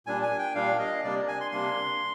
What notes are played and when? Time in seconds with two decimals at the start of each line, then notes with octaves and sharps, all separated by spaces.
0.07 A#2 G3 D4 G#5
0.23 G#5
0.39 G5
0.55 A#2 G3 D4 F5
0.79 D#5
1.04 C3 G3 A#3 D4 D5
1.28 G#5
1.41 C6
1.52 C3 G3 A#3 D4 C6